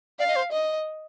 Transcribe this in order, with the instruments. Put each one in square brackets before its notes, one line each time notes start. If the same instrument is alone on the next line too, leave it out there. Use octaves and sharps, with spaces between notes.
[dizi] D5 [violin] F5
[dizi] D#5
C5
[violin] D#5